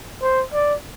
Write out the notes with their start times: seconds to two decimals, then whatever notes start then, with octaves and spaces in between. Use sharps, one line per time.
0.22 C5
0.53 D5